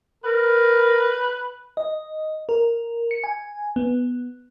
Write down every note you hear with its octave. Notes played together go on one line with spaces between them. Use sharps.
A#4 B4
D#5
A#4
C#7
G#5
B3